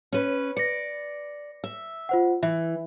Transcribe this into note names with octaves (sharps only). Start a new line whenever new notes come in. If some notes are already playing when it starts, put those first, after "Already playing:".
C#4 B4
D5 A#6 C#7
E5
F4 C5 F#5
E3 E5